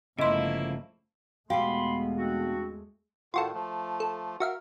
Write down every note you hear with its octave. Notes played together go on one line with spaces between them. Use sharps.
G1 C#3 F3 A3 A#3 E4 D#5 C6
E2 B2 G#3 A3 G4 F5 B5 C6
C4 D4 F#4
A2 D#3 F4 F#4 A4
F3 A3
A4
F#4 A#4 E5 F5